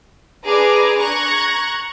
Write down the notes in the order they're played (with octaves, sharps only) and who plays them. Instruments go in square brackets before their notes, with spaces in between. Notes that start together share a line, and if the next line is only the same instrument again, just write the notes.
[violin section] D4 G#4 B4 G#5 A#5 D6
A#5 C#6 F#6 G#6 A#6